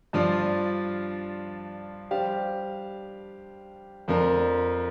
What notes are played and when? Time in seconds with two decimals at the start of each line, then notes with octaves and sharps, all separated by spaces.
0.13 G2 F3 D4 F4 D5
2.11 G3 D4 G4 C5 F5
4.08 F2 F3 D4 A#4